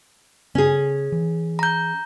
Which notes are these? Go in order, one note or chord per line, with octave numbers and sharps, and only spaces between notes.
C#3 C#4 G#4
E3
A#5 G6